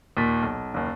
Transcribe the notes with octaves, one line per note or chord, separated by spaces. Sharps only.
D#2 A#2 B6
B1
F#1 D#2